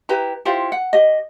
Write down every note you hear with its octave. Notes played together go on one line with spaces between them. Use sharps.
E4 G4 B4 A#5
E4 F4 G4 C5
F#5
G4 D#5